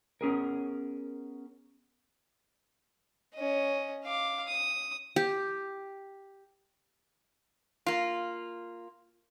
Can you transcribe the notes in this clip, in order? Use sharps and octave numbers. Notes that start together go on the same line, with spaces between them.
B3 C#4 G#4 A#4
C#4 D#5
F5 D6
D#6
G4
A#3 F4